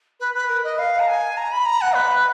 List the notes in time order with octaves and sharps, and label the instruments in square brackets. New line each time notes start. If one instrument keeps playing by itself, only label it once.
[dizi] B4
B4
A#4
D#5
F5
A#5
G#5
A#5
B5
A#5
F#5
B4